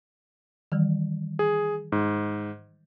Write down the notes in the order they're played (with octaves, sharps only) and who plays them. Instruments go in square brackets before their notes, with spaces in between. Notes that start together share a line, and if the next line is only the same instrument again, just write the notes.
[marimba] D#3 E3 G3
[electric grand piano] G#4
G#2